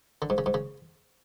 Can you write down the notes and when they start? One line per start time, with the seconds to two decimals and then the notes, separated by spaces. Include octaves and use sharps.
0.22 D3
0.30 G#2
0.38 C#3
0.46 G#2
0.54 C#3